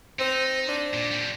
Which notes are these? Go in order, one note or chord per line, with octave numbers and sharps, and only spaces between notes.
C4 D#4
D4
A#2
A#2 G3